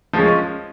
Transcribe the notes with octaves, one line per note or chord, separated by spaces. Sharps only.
F3 G#3 C#4